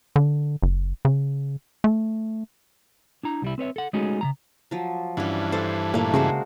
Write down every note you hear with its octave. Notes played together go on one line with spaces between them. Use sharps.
D3
F#1
C#3
A3
D4 E4 A#5
C2 G3 E4
C4 B4 C#5 E5
A4 F#5
G#3 A3 C#4 D#4 F#4 G#4
C#3 F#3 A#5
F3 F#3
G2 E3 C#4 D4
A4 C5
A#2 A3 A#3
C#3 G#3 F#4 C5